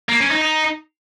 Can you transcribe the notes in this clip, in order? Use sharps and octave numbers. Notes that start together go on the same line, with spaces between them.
A#3
C#4
D#4
D#4